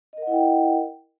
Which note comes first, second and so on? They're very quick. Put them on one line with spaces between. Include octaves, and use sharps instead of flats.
D#5 A#4 F#5 E4 G5